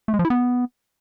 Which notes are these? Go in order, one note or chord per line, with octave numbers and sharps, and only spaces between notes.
A3
G#3
F3
E4
B3